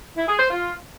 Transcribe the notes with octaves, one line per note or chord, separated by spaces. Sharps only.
E4
G#4
C5
F4